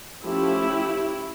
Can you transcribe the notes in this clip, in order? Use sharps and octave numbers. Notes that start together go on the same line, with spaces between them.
F3 A3 C#4 E4 G4